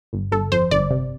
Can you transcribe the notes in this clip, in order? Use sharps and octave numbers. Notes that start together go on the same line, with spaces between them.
G1
G1 A4
F2 C5
G1 D5
C3